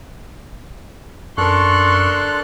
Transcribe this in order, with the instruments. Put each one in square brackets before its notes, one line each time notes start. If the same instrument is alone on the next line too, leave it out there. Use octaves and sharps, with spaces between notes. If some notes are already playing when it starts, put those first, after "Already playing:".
[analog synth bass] F#2 [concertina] D4 A4 F#6 [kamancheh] A#4 C6 [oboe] C#6